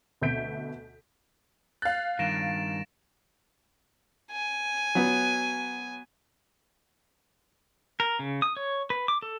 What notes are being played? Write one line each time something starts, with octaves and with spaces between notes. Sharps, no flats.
D2 B2 E5 G6 B6 D7
F5 F#6 A6
G2 D#3 A#6 D7 E7
G#5
F#3 B3
A#4
C#3
D#6
C#5
B4
D6
A4